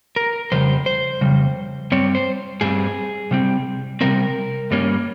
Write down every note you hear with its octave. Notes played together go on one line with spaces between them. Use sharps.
A#4
F2 C#3 G3 C5
C5
F2 C#3 G3
G2 G3 C4 C#5
C5
G2 G3 C4 G#4
C3 G3 C4
C3 G3 C4 A#4
G2 G3 A#3 C#4